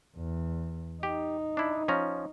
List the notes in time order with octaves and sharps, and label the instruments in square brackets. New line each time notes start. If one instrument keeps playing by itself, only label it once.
[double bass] E2
[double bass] D#4 [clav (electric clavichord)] G4
[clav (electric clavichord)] D4 E4
F3 C#4 A#5